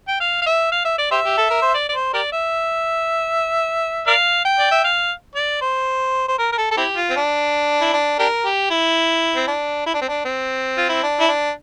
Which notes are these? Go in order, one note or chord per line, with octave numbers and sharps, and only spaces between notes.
G5
F5
F5
E5
F5
E5
D5
G4 C5 E5
G4
A4
A#4
C5
D5
D5
C5
G4 A#4 D5
E5
A#4 D5 F5
G5
D5
E5
F5
D5
C5
C5
A#4
A#4
A4
A4
C4 E4 G4
F4
C4
D4
E4
D4
D4 G4 A#4
G4
E4
C4
D4
E4
D4
C4
D4
C4
F4
E4
D4
E4
D4